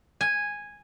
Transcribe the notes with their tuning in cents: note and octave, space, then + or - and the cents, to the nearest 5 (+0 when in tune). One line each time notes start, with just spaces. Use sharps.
G#5 -5